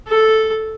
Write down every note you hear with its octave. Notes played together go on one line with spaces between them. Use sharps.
A4